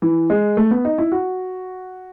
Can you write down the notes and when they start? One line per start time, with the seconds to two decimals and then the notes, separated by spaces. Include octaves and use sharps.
0.02 E3
0.30 G#3
0.57 A3
0.71 B3
0.85 D#4
0.98 E4
1.12 F#4